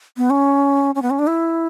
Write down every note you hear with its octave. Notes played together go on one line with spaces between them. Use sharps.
B3
C#4
C#4
B3
C#4
D4
E4